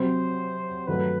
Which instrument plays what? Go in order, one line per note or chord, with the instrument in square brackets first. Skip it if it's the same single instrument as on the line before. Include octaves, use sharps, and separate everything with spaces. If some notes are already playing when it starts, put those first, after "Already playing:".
Already playing: [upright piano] C3 F#3 C4 [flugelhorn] C5
[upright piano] G2 D#3 F#3 A3 [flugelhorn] B4